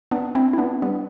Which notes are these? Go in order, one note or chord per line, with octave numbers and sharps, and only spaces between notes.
B3 D4
C4 E4
E4
B3 D4
G3 B3